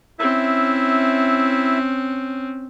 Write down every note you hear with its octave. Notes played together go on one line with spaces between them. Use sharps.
C4 C#4 E4 E5